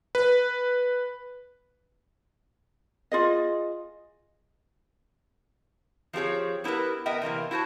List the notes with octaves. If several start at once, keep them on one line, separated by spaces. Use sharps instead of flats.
B4
F4 G#4 D#5
F3 C4 G4 G#4 C#5
B3 E4 G4 A#4 B4
B3 A#4 D#5 E5 G5
C3 E3 A3 A#3
E4 F#4 C5 A5